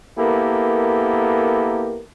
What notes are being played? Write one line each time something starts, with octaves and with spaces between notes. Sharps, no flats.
A#3 B3 E4 G4 A4 A#4